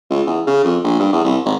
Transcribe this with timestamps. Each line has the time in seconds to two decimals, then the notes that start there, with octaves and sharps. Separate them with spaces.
0.10 C#2
0.27 E2
0.47 C#3
0.64 F2
0.84 A#1
1.00 G2
1.13 E2
1.24 C2
1.45 G#1